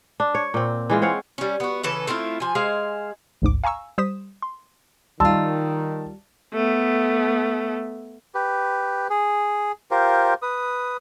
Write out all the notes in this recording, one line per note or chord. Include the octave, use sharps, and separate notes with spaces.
D4
C#5
A#2 C4
E3 G#3 F4
C4 C#5 F5 F#5
G3 C#4
B3 F#4
C#3 E3 A4 B4
A3 C4 E4 F4
F3 G#5
G#3 G#4 C5 F5
A1 D2 G#2 D6
F5 G#5 A#5 C#6 E6
G3 C5 D#6 B6 E7
C6
D#3 G3 F4 A5 C6 E6
A3 B3
G4 B4
G#4
F4 G4 A#4 C5
B4 D#6